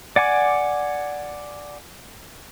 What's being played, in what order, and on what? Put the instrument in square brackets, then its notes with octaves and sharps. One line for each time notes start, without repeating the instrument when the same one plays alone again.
[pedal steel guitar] D5 F#5 G#5 D6